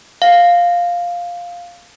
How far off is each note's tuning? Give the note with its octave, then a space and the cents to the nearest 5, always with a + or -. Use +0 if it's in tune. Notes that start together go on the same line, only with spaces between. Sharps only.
F5 +5